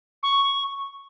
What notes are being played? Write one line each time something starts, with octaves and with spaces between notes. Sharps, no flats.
C#6